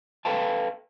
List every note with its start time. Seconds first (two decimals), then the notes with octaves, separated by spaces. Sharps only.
0.25 A4 B4 F5 G5 A5